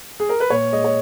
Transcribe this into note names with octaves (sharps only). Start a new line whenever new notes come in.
G#4
A#4
B4
A#2 C#5
G#3 D#5
C#5